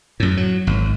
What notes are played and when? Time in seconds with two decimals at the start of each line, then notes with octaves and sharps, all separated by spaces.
0.20 F#2 A2
0.37 F#3
0.67 G#1